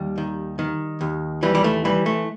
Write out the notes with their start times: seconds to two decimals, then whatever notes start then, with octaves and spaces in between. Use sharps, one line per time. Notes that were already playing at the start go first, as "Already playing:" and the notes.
Already playing: D#2 G3
0.18 D#3
0.59 D#3
1.01 D#2
1.43 E3 G3
1.55 G3
1.64 A3
1.85 E3 G3
2.06 A3